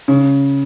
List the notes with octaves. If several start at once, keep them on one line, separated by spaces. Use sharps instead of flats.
C#3